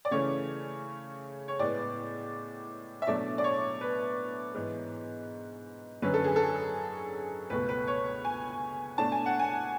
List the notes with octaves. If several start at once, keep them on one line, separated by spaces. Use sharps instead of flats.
D5
C#3 E3 A3 C#4 C#5
C#5
A2 G#3 B3 D5
E5
B2 F#3 A3 D4 D5
D5
C#5
B4
G#2 E3 B3
F#2 D3 F#3 C#4 B4
A4
G#4
A4
C#2 B2 A3 B4
B4
C#5
G#5
B2 A3 D4 A5
G#5
F#5
G#5